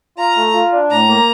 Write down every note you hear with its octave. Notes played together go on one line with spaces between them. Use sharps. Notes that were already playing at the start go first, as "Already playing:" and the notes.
F4 A#5
A3
F4
D4
A2 A#5
A#3